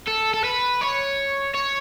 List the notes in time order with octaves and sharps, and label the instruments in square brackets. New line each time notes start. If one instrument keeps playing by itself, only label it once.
[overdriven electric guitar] A4
A4
B4
C#5
C#5